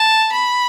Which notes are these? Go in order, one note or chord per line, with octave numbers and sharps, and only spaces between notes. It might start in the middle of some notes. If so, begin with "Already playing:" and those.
Already playing: A5
B5